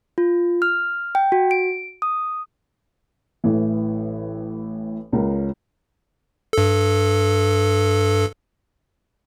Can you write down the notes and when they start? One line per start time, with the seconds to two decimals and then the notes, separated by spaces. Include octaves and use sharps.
0.18 F4
0.62 F6
1.15 G5
1.32 F#4
1.51 D7
2.02 D#6
3.44 A1 A2 E3
5.12 C#2 C#4 A#4
6.53 G2 A4